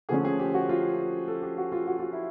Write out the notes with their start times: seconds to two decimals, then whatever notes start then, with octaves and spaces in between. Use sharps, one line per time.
0.09 D3 F3 A3 C#4 G#4
0.25 G#4
0.39 G4
0.54 F#4
0.69 F4
1.28 A4
1.42 G4
1.58 F#4
1.72 F4
1.87 F#4
1.99 F4
2.13 E4